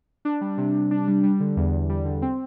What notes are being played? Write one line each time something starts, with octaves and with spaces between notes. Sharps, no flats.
D4
G3
C3
C3
D4
G3
G3
D3
E2
E2
G3
D3
C4